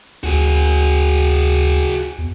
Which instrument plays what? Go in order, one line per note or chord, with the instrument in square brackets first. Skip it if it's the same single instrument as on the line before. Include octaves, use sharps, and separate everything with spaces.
[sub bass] D2 [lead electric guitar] F#4 G#4
[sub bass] E2